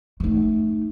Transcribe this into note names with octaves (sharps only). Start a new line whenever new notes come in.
A3 D#4